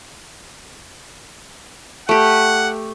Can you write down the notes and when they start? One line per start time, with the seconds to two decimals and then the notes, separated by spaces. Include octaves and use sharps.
2.09 A3 G4 F#5